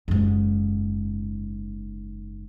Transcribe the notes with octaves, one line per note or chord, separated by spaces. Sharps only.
F#1 G#2